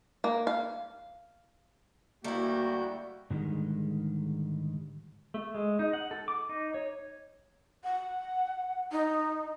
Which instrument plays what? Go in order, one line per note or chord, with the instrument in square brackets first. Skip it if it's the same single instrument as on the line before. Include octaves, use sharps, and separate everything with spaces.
[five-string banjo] A#3
F5
[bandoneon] D2 A3 G6 [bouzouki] G3 E4 [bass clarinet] A#3 [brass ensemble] F#4
[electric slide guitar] G#2 D3 D#3 G3 G#3
[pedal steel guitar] A3
G#3
D#4
F#5
A4
D6
D#4
C#5
[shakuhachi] F#5
D#4